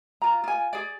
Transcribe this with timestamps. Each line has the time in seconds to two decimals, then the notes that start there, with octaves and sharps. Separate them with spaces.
0.22 F4 A#5
0.44 F4 G#5
0.73 G#4 D5